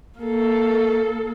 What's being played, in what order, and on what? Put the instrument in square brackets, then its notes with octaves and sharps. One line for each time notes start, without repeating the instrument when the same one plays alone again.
[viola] A#3 A4